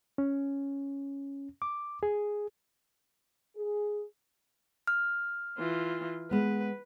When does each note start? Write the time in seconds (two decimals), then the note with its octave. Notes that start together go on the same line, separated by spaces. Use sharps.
0.18 C#4
1.62 D6
2.03 G#4
3.56 G#4
4.87 F6
5.57 E3 F4
6.31 G#3 B3 B4